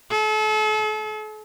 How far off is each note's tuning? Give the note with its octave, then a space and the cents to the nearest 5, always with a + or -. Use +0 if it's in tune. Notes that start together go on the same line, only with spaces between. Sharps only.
A4 -40